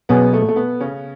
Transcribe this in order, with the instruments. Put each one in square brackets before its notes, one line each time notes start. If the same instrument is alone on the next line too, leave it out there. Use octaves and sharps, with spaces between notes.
[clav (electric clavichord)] B2 F#3 C#4 G#4 [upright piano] B3
[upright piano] A3
A3
B3
C#3 C#4